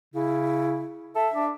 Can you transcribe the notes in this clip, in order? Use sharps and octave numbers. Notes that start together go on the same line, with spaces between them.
C#3 E4
A4 E5
D4